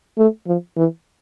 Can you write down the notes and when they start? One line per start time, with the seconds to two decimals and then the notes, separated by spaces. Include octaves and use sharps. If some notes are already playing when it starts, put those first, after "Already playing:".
0.18 A3
0.47 F3
0.77 E3